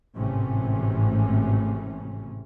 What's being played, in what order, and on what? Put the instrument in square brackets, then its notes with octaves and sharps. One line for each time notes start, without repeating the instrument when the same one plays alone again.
[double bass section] G#1 A2 C3 E3 A3 C#4